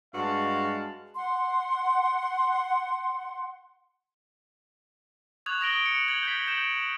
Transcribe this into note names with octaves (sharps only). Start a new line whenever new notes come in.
G2 G#3 F#4 F5 A5
F#5 C6
C#6 D#6 F#6 G#6 F7
D#6 A#6 D7 G7
C#7
G#6 F#7
G6 G#6 B6
G6 D7 E7 F#7